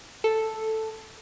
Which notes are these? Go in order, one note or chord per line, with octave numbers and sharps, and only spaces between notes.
A4